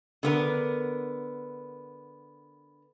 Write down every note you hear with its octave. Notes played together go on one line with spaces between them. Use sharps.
D3 B3 A#4